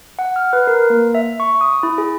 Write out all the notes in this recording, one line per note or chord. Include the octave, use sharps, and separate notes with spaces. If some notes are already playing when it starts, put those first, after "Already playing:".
F#5
F6
B4
A#4
A#3
E5
C#6
D#6
E4
G#4